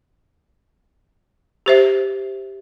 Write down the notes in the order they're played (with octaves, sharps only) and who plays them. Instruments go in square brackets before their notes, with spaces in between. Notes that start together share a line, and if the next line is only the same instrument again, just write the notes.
[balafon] G4 C5 E5